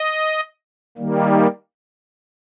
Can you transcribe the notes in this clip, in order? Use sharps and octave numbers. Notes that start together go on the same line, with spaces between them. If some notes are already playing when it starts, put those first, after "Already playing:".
Already playing: D#5
D#3 G3 A#3